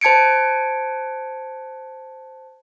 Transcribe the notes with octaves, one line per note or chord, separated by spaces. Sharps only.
C5 A5 G#6 C#7 D7